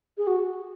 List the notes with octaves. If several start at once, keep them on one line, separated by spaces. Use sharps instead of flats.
G#4
F#4